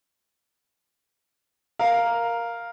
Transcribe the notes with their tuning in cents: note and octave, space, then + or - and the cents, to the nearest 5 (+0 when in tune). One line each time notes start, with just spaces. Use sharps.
A#4 +0 F5 +0